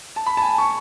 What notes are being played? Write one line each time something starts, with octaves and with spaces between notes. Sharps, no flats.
A5
B5
A5
G#5
C#6